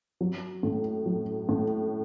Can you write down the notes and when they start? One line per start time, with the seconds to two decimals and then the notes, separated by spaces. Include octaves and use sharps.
0.21 F#3
0.63 A2
1.06 F#3
1.49 A2